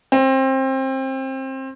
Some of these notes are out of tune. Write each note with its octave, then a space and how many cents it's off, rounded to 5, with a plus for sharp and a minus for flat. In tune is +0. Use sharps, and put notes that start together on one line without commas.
C4 +25